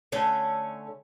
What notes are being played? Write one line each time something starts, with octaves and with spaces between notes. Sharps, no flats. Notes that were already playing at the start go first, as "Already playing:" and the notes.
D3 A3 C#4